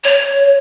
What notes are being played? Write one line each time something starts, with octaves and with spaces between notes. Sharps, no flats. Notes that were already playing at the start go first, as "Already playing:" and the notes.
C#5